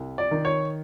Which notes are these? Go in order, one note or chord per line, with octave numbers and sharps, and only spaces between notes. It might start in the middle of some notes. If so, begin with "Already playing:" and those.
Already playing: C2
D5
D#3
C#5